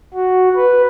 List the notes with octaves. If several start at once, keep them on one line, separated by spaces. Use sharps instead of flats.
F#4
B4